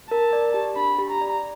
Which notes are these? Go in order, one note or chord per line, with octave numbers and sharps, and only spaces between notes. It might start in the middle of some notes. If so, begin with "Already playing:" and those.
A#4 A5
D5
G4
D4 B5
G4
A#5
D5